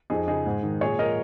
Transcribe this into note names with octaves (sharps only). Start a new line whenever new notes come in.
F2 D#4 G#4
C#3 F3 D#4 G#4
G#2
D#3
A#2 G#4 C#5
F3 A#4 D#5